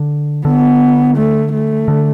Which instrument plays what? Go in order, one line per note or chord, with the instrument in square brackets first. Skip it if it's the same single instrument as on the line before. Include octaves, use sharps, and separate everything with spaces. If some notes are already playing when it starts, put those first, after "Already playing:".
Already playing: [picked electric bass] D3
[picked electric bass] D3 [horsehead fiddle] B3
[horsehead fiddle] A3
A3
[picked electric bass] D3